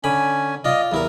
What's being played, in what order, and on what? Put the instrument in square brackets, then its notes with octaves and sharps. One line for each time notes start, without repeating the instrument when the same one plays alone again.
[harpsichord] D3 B5 [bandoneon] C#4 G#5
[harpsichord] F4 D5 [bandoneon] D#5
[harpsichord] E2 E4 A#4 [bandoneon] G3